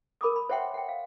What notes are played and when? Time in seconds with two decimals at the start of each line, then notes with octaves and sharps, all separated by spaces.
0.21 A#4 B5 D6 D#6
0.36 B5
0.49 C5 C#5 E5 F#5 G5 C6
0.74 F#5 G5
0.89 F5